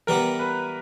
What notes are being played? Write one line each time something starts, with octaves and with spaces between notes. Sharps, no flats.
E3 G3 B3 A#4
B4